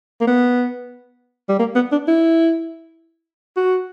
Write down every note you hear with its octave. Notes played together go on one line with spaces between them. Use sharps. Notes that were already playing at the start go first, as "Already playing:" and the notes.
A#3
B3
G3
A#3
B3
D4
E4
F#4